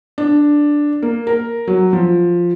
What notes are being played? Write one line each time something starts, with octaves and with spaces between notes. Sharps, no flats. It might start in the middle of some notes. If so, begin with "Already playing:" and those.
D4
A#3
A#4
F#3
F3